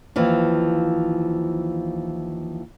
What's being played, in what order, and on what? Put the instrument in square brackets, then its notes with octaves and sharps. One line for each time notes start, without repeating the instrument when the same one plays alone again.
[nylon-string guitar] D#2 E3 F3